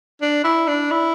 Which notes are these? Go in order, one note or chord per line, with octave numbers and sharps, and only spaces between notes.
D4
E4
D4
E4